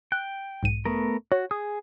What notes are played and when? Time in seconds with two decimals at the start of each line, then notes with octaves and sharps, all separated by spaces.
0.12 G5 F#6
0.63 B1 G#2 D#7
0.85 A3 B3 A#4
1.32 F#4 C#5
1.51 G#4 D#6